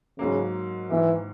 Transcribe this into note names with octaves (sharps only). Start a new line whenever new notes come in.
G#2 C#3 F#3 A#3
G#2 D#3 E3 A#3